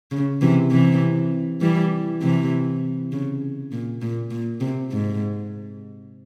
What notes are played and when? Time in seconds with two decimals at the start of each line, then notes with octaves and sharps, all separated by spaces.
0.11 C#3
0.41 C3 E3
0.71 C3 E3
1.61 E3 G3
2.22 C3 E3
3.12 C#3
3.72 A#2
4.02 A#2
4.31 A#2
4.61 C3
4.92 G#2